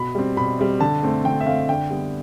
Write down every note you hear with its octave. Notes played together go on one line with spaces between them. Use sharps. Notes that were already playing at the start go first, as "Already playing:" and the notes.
Already playing: B2 B5
G3 C4
B2 B5
G3 C4
D3 A5
A3 C4
D3 G5
E5
A3 C4 F5
D3 G5
G3 B3